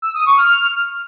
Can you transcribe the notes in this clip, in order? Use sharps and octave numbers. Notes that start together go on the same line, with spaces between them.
E6
D#6
C#6
F6